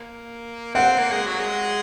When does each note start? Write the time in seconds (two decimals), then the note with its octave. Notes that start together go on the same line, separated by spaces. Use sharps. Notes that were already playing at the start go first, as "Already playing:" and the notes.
Already playing: A#3
0.75 C4 F#5
0.98 A#3
1.11 G#3
1.26 F#3
1.40 G#3